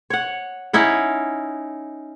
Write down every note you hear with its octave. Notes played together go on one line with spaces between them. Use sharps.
C#5 F#5
C#4 D#4 E4 F#5